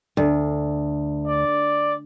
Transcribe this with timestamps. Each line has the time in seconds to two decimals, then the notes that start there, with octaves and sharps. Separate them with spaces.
0.17 D2
1.27 D5